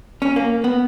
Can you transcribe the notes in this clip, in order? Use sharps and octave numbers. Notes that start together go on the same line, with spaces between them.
C#4
A#3
B3